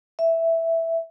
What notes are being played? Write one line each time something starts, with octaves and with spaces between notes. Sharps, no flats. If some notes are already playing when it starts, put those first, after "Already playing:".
E5